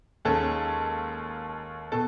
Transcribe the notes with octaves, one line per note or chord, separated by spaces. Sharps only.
D#2 D#3 G#3 C#4 A4
B2 A4